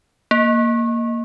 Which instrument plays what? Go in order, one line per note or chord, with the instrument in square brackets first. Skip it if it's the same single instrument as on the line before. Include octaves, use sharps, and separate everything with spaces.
[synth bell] A#3